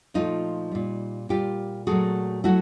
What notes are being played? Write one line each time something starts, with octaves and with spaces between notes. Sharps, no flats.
A#2 F3 A3 D#4 F4
A#2 G3
A#2 G3 F4 G4
A#2 F#3 A3 F#4 G#4
F#3 A3 E4 F#4